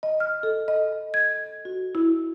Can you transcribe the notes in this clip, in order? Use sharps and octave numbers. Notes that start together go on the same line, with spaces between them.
D#5
F6
A4
D#5
G#6
F#4
E4